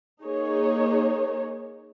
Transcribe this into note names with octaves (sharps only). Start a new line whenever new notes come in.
A#3 D#4 G#4 C#5